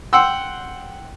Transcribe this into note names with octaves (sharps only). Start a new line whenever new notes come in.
F#5 G5 C6 E6